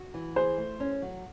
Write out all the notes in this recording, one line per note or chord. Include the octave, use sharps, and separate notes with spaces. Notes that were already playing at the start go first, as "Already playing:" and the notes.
Already playing: F#4
E3
G#4 C5
A3
C#4
F#3